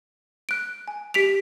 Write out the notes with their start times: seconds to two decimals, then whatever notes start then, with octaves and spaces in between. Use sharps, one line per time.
0.49 F#6 D7
0.88 G#5
1.14 G4 B6 D7 F7